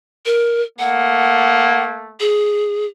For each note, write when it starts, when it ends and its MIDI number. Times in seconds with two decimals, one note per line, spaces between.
0.26 0.62 70
0.79 2.15 57
0.79 2.15 58
0.79 1.83 78
2.20 2.86 68